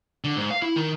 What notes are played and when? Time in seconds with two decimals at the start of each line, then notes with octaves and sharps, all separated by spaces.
0.24 D3
0.36 G#2
0.51 F5
0.62 E4
0.76 D#3